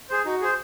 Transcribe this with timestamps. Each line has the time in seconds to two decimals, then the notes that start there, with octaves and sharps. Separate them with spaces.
0.09 G#4 C5
0.25 D#4 F#4
0.41 G#4 C5